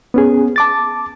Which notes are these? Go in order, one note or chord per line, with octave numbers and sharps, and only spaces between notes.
B3 C#4 G#4
A5 D6 A6